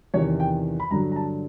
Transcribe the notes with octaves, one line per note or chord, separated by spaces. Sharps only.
E2 C3 D#3 C#5
G5
B5
G2 D3 F#3 A#5
A#5
A5